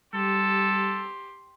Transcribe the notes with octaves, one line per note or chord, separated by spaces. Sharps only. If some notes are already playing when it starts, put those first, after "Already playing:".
G3 G4 A4 C6